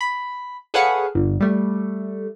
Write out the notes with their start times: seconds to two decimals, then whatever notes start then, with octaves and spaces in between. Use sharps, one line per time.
0.01 B5
0.74 G#4 A4 B4 C#5 F5 F#5
1.15 G1
1.40 G3 A3